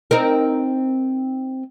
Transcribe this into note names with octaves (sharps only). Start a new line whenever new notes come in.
C4 D#4 A#4